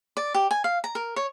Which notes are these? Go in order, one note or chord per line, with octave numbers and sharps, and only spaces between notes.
D5
G4
G#5
F5
A#5
A#4
C#5